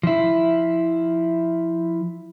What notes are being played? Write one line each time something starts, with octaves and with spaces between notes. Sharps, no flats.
F3 E4